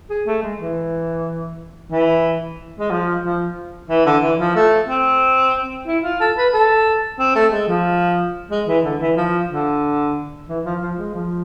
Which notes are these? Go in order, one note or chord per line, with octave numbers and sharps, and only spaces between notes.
G#4
A3
G#3
E3
E3
G#3
F3
F3
E3
D3
E3
F3
A3
C4
E4
F4
A4
B4
A4
C4
A3
G#3
F3
G#3
E3
D3
E3
F3
D3
E3
F3
F3
G#3
F3